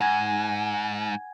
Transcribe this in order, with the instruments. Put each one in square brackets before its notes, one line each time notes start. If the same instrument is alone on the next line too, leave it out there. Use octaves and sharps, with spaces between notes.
[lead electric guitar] G#2 [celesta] F#5 G#5 G#6